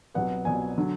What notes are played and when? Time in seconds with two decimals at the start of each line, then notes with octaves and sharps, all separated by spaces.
0.14 C2 B2 F#3 B3 F#5
0.45 C2 B2 F#3 B3 G#5
0.78 D3 F#3